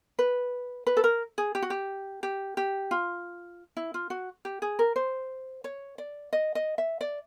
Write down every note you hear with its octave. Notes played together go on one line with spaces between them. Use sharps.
B4
B4
A4
A#4
G#4
G4
F#4
G4
G4
G4
F4
E4
F4
F#4
G4
G#4
A#4
C5
C#5
D5
D#5
D#5
E5
D5